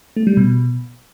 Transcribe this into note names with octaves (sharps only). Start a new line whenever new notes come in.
A3
G3
B2